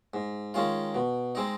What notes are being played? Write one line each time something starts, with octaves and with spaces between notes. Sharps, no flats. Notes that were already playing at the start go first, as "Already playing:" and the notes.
G#2
D#3 G#3 C#4 F4
B2
G#3 C4 D#4